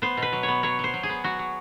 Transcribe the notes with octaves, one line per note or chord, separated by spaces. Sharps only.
B3 C5
B2
B4
F#3
C#5
B3
F#3 C#5
F#3 C5
F#3
G#4
B3
F#3 F#4
F#3